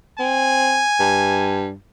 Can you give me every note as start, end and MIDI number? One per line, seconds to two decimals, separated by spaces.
0.19 0.83 60
0.19 1.70 80
0.99 1.75 43